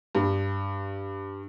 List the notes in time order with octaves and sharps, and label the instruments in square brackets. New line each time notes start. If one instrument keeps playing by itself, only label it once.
[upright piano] G2